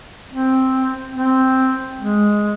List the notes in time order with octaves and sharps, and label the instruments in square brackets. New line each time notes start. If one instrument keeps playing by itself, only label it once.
[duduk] C4
C4
G#3